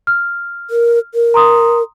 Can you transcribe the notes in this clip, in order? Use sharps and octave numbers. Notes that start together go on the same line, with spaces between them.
F6
A#4
A#4
A#5 C6 D#6